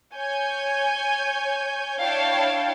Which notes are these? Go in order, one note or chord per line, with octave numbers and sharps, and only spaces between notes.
C#5 G#5 G6
D4 E4 C#5 F5 G5 A5